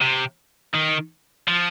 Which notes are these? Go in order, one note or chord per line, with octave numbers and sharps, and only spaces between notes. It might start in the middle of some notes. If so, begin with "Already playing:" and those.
C3
D#3
F3